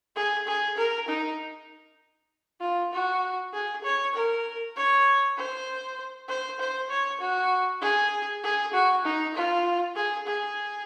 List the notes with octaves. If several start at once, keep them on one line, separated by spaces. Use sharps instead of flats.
G#4
G#4
A#4
D#4
F4
F#4
G#4
C#5
A#4
C#5
C5
C5
C5
C#5
F#4
G#4
G#4
F#4
D#4
F4
G#4
G#4